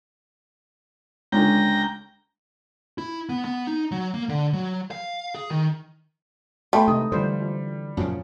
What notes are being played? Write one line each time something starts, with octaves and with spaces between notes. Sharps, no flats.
C#2 D3 G5 A#5
E4
B3
B3
D#4
F#3
A#3
D3
F#3
F5
G#4
D#3
A3 B3 G5 B5 C6
C3 E3 G#3 D#4 D#6
D3 E3 G3 F4 C5
F3
F#2 A#2 C#3 F3 C#4